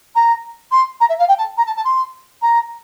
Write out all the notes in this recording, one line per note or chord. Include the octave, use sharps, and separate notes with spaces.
A#5
C6
A#5
E5
F5
G5
A5
A#5
A5
A5
C6
A#5